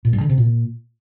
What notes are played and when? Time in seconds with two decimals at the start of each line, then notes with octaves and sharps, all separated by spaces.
0.05 A#2
0.13 G2
0.21 D3
0.30 C3
0.38 A#2